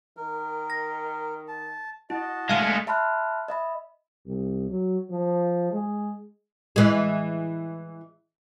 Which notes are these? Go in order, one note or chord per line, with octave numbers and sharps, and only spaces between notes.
D#3 A#4
A#6
A5
E4 F#4 D#5 A5
D3 G#3 A3 F5 F6
E5 A5 B5 C6 F6 F#6
D#5 E5 B5
C2
F#3
F3
G#3
E3 G#3